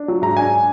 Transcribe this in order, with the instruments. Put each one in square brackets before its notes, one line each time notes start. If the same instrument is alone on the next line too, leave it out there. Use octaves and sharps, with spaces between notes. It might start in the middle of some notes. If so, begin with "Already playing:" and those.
Already playing: [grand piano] D4
F#3
G#2 A#5
D4 G#5